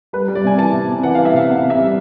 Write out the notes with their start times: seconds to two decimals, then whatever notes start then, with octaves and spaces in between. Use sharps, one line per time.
0.13 G3 B4
0.28 G3
0.35 D5
0.44 C3 G#5
0.58 E3 A5
0.73 C3
0.88 C3
1.03 E3 F#5
1.15 F5
1.18 E3
1.25 E5
1.34 C3 F5
1.48 C3 F#5
1.64 C3
1.70 E5
1.78 G3